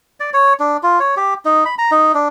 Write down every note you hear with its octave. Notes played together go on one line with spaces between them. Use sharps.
D5
C#5
D4
F4
C#5
G4
D#4
B5
A#5
D#4
D4